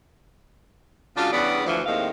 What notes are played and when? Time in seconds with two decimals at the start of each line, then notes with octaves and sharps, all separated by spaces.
1.17 C#3 F#3 G#3 D4 F4
1.32 E2 G2 C#3 B3 D5
1.65 D2 E3 F3
1.86 D#2 A2 D#3 G#3 C4 F5